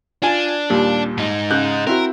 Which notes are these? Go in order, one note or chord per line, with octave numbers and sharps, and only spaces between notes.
D4 F4 G#5
D#2 A#2 G3
G#2 D#4
C#3 F#6 G6
C4 E4 F#4 A#4